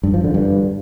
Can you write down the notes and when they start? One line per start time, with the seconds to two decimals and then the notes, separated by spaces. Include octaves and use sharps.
0.03 G2
0.14 F3
0.24 D3
0.34 G2